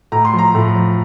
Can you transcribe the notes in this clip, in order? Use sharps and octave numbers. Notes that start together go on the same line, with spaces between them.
A2 A#5
C6
F3 A#5
A2
F3